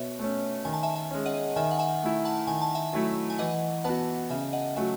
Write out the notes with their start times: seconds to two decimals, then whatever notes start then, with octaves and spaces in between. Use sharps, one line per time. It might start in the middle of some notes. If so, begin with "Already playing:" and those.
Already playing: B2 C#5 E5
0.19 A3 C#4
0.65 D#3 G#5
0.74 A5
0.83 E5 G#5
0.96 E5 G#5
1.11 G#3 C#4
1.26 D#5 F#5
1.56 D#3 E5 G#5
1.71 F#5
1.79 E5 G#5
2.02 A3 E4
2.25 F#5 A5
2.47 D#3 G#5
2.62 A5
2.75 E5 G#5
2.93 F#3 A3 E4
3.30 G#5
3.38 E3 D#5 F#5
3.84 B3 F#4 F#5 A5
4.30 C#3 E5 G#5
4.42 E5
4.53 D#5 F#5
4.76 F#3 A3 E5 G#5